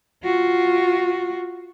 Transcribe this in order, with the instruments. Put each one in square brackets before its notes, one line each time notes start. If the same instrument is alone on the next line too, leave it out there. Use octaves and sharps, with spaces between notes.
[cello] F4 F#4